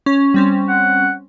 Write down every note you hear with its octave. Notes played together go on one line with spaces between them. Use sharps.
C#4
G3 C4 C#4
F#5